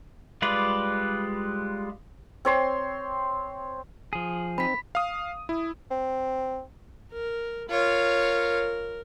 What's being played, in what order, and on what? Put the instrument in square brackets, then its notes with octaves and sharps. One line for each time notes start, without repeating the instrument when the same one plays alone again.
[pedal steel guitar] G3 G#3 F4 B4 D5
[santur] C4 C#5 C6
[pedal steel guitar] F3 G#4
[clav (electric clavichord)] C4 D#4 [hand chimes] B5 B6
[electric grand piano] F5 D#6
E4
[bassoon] C4
[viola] A#4
[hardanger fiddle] F4 C#5 [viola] A#4